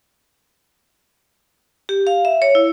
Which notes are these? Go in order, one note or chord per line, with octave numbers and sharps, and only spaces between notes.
G4
F5
E5
C#5
E4